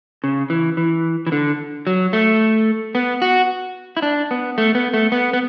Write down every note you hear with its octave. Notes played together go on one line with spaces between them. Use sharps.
C#3
E3
E3
E3
D3
F#3
A3
B3
F#4
E4
D4
B3
A3
B3
A3
B3
B3